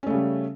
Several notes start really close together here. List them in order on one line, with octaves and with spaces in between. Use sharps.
C#4 A3 C#3 G3